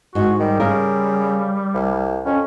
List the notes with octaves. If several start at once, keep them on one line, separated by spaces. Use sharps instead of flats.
G#2 F#4
D#3 G3
C#3 A#4
C2
F2 C#4